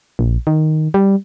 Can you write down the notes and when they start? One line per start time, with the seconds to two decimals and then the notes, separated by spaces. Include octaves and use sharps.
0.19 A#1
0.47 D#3
0.94 G3